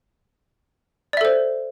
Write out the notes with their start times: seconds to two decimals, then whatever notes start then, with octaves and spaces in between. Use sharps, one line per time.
1.13 D5
1.17 E5
1.21 A4
1.25 C5